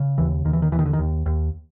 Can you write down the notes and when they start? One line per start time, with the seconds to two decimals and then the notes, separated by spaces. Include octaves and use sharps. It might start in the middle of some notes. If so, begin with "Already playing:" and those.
Already playing: C#3
0.18 D#2 E3
0.45 D#2 D#3
0.53 E3
0.62 D#3
0.72 D#2 E3
0.79 D#3
0.86 D3
0.93 D#3
0.99 D#2
1.26 D#2